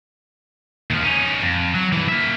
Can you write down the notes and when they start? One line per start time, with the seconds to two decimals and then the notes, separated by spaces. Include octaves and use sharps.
0.91 D#2 F3
1.03 C#4 D#4
1.42 F2
1.74 F#3
1.92 G2 E3
2.08 A#3 E5